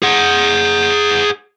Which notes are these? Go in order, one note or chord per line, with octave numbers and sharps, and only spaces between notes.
G#4 F#5